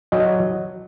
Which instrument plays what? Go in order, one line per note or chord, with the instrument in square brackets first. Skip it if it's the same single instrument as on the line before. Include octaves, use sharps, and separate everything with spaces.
[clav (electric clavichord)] F#3 D#5